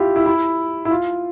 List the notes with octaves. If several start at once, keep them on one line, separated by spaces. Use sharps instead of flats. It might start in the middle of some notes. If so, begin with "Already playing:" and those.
Already playing: E4 F4 G4
E4
E4
E4
F4